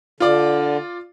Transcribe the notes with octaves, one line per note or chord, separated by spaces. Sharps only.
D3 F4 D5